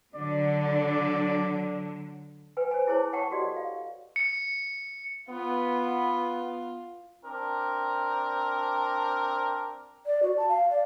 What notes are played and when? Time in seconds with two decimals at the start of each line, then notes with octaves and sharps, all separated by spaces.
0.16 D3 F#3 D5
2.57 B4 G5 G#5
2.71 C5 G#5
2.87 E4 G#4 C5 C#5 A5
3.12 C#5 F#5 G5 A5 C#6
3.32 F#4 G4 A4 D5 D#5
3.57 F5
4.16 C#7
5.30 B3 F4
7.25 C4 D4 A#4
10.06 D5
10.23 F#4
10.37 A5
10.49 F5
10.70 D5